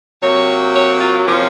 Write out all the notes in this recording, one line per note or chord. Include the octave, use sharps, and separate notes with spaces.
C3 F#3 A#3 C#5
C#5
F4
C3 F3 A#3 C#4